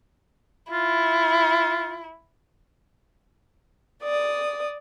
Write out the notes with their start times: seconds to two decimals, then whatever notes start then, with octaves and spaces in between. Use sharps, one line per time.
0.72 E4 F4
4.02 D5 D#6